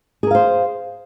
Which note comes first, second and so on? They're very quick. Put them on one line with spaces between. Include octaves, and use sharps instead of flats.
G#4 A#4 F5 C5